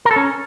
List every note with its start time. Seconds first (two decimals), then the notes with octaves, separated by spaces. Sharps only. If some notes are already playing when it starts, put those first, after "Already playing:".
0.05 A#4
0.11 A4
0.16 C#4